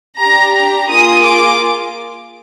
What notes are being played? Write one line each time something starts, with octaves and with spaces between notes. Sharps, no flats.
D4 G4 A#5
A#5
A#3 F4 G#4 D#6
D6